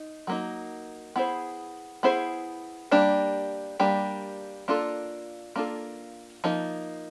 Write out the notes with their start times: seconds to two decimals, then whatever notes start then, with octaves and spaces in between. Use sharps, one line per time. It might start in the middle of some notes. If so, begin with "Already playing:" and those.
Already playing: D#4
0.27 F#3 A#3 D#4
1.16 B3 E4 G#4 C5
2.03 B3 E4 G#4 C5
2.91 G3 A#3 D4 G4
3.80 G3 A#3 D4 G4
4.68 A#3 D4 F4 A4
5.56 A#3 D4 F4 A4
6.44 F3 A#3 D#4